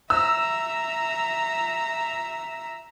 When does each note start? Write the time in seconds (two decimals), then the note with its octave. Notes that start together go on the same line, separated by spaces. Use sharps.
0.10 E5 A#5 E6